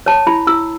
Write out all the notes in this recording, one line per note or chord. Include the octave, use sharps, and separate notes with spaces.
C#5 A5
E4 B5
E4 E6